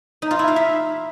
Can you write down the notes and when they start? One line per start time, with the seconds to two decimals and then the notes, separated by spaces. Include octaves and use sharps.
0.22 D#4
0.31 F4
0.39 E4
0.48 F5
0.56 E5